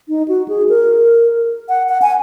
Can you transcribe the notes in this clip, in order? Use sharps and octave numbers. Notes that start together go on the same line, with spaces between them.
D#4
F#4
G#4
A#4
F#5
F#5
G#5